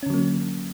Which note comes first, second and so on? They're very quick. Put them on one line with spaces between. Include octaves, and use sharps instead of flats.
C#4 D3 F#3 A#3